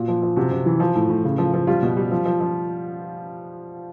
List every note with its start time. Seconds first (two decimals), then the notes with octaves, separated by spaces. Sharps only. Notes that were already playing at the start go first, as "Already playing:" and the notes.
Already playing: A#2 F#4
0.08 F3
0.22 F3
0.36 C3 F#4
0.51 C3
0.66 E3
0.80 F3
0.95 A2
1.10 A2
1.25 C#3
1.38 F3
1.54 F3
1.67 G3 F4
1.83 B2
1.97 G3
2.11 F3
2.25 F3
2.40 F3